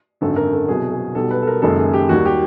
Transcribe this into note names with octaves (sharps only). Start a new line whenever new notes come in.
G#1 F#2 D3 A4
A#4
A4
C2 B2 F#3 G#4
G#4
B1 B2 G3 A4
B4
A4
A#4
F#1 F#2 D#3 G#3 A4
G#4
G4
D#2 D#3 G3 F#4
G4